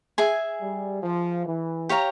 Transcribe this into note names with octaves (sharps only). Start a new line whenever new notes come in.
G#4 E5 G#5
G3
F3
E3
G4 C#5 F5 A#5